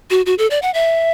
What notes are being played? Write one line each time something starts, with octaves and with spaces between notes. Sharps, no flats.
F#4
F#4
A4
D5
F#5
E5